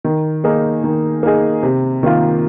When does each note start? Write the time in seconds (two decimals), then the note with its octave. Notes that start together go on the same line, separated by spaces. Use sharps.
0.05 D#3
0.44 A#3 D#4 G#4
0.84 D#3
1.23 A#3 D#4 G#4
1.63 C3
2.03 D#3 A#3 F4